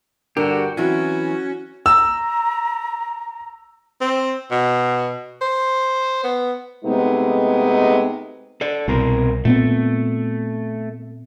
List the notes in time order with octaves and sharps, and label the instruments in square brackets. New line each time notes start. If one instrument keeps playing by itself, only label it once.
[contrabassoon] G2 [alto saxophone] D3 [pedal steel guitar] F#4 G4 [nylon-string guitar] A#4
[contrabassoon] E3 [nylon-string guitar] F#3 C4 E4 [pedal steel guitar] C#4 [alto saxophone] F#4
[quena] A#5 [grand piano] E6
[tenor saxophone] C4
B2
C5
B3
[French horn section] C3 G#3 A3 B3 D#4
[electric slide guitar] A4 D5
[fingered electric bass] C2 [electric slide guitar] B2 C4 A#4
[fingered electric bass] A#2 B3 C4 [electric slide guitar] A3